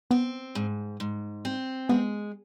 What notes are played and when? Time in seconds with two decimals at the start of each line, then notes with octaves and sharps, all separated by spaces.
0.11 B3 C4
0.55 G#2
1.00 G#2
1.45 C4
1.89 G#3 B3